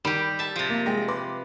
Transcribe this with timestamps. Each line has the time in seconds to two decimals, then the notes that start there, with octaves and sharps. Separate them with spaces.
0.05 D#3 G3 G4 B5 D7
0.39 E5 A5
0.56 C3 F3
0.69 A#3
0.86 G#3 G5 A#6
1.08 B4 C6 D6